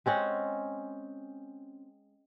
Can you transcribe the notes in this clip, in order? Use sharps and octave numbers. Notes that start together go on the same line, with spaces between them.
G#3 C4 C#4 F#5